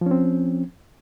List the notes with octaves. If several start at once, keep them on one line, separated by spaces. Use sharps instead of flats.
F3 C4 C#4